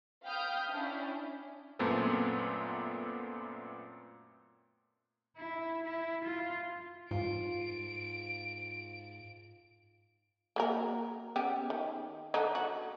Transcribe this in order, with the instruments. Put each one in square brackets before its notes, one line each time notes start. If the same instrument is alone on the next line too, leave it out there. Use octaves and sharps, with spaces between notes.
[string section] F5 G5 B5 D#6 F6 G6
C#4 D4 E4
[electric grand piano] F#2 A#2 A3 B3 C4
[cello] E4
E4
F4
[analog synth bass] G#2 [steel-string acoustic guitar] F4 [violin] D7
[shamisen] A#3 F#4 A#4
B3 C#4 G4
D#3
D3 D#4
F#4